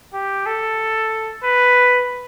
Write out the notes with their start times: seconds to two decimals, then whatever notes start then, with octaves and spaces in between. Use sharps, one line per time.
0.14 G4
0.46 A4
1.44 B4